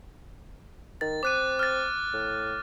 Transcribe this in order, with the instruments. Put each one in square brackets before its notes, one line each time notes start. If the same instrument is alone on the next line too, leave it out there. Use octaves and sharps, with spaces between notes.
[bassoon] D#3 [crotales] A6
[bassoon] C4 [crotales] D6 F#6 D#7
[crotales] F6 A6
[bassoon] A2